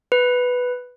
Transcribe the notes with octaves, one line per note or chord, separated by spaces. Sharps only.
B4